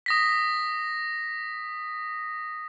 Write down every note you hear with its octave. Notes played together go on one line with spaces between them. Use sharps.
D#6 A#6 B6